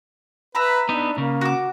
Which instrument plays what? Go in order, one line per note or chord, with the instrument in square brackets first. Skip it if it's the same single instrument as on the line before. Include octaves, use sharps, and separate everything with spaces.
[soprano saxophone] B4 [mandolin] E5 A#5 B5
[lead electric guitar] B3 D#4 [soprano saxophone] D4
[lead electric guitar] C#3 [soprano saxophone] A#3
[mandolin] F#4 D6